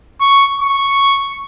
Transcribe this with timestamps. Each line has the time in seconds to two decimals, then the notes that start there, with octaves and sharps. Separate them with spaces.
0.21 C#6
0.61 C#6